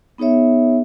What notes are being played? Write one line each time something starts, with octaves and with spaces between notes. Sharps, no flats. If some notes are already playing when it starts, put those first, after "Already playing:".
B3 D#4 G#4 C#5 E5